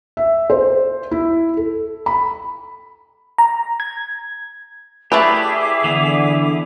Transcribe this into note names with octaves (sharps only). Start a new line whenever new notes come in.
E5
C5
E4
A4
B5
A#5
G#6
A3 E4 G4 G#4 B4 D5 E5 D6
D3 E3 B3